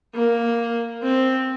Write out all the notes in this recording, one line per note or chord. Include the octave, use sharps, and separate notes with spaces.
A#3
C4